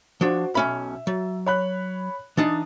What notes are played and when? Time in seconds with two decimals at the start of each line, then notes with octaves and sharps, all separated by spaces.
0.21 F3 D4 F#4 C5
0.55 B1 C#4 E5 B5
1.07 F#3
1.46 C#5 B5 F#6
2.37 E3 D4 D#4 D#6 A6